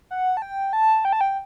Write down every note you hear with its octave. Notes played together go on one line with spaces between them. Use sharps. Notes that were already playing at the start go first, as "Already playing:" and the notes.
F#5
A5
G5
A5
G5
A5
G5